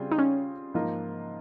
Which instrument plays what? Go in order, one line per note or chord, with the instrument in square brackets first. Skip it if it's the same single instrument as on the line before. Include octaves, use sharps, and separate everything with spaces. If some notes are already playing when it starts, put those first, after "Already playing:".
Already playing: [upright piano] C#3 G3 C4 F4 G#4
[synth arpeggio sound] D#4
C#4
[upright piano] G#2 F3 A#3 F4 A#4